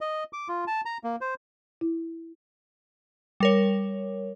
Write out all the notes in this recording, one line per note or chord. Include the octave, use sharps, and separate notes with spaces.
D#5
D6
F4
A5
A#5
A#3
C5
E4
G3 A#4 C#5